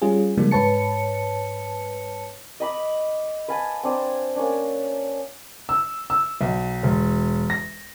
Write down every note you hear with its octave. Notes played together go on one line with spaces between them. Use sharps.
G3 C#4 F4 G#4
C#3 F3 G3 G#3 A#3 D4
G#2 B4 C#5 A5 C#7
D#5 B5 D6
B4 F5 G#5 A5
C4 D4 C5
A#3 C#4 D4
E6
E6
B1
E1
A#6